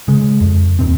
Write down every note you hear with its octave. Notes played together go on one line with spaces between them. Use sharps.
C#3 G#3
F2
D#2 A#2 C4